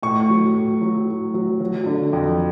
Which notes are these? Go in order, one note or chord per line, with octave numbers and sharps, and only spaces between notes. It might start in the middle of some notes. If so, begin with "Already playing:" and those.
A2 C#6
F#3
A2
F#3
A2
F#3
F#3
D3
F2